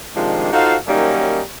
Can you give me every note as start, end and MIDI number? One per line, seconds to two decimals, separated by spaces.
0.16 0.51 48
0.16 0.51 51
0.16 0.51 53
0.16 0.51 56
0.16 0.51 62
0.52 0.76 63
0.52 0.76 65
0.52 0.76 66
0.52 0.76 69
0.52 0.76 72
0.52 0.76 77
0.87 1.41 51
0.87 1.41 54
0.87 1.41 55
0.87 1.41 58
0.87 1.41 61
0.87 1.41 63